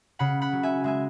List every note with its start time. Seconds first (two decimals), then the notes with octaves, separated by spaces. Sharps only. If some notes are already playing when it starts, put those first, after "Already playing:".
0.19 C#3 F#5 B5
0.41 F#5 B5
0.52 F#3
0.63 E5 G#5
0.84 G#3 E5 G#5